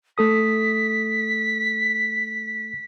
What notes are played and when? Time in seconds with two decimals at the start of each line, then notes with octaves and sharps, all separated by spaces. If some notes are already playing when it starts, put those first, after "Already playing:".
0.18 A3 A4 D#6 B6